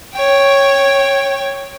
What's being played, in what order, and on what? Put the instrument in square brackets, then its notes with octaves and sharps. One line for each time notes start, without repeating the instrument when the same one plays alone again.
[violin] C#5 G5